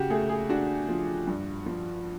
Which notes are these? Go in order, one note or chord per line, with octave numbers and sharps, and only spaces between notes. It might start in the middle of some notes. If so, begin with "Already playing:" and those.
Already playing: C#3 F#4 G4
A3 G#4
G#4
D4 F#4
F3
G2
F3